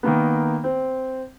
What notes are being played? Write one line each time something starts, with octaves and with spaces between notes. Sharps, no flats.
D#3 A#3 B3
C4